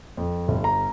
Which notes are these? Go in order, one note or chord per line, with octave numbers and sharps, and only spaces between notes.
F2
G1
A#5